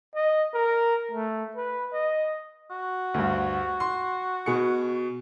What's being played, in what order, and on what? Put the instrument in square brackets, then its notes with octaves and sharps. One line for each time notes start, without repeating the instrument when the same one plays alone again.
[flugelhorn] D#5
A#4
A3
B4
D#5
[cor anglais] F#4
[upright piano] D2 G2
C6
B2 G#4 C#7